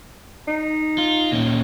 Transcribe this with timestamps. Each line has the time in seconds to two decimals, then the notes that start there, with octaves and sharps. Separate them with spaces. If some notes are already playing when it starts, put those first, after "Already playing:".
0.48 D#4
0.98 F4
1.32 A#2 C#4